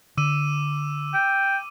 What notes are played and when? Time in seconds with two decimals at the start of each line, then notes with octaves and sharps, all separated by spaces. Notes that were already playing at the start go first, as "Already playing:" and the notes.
0.17 D3 D6 E6 D#7
1.14 G5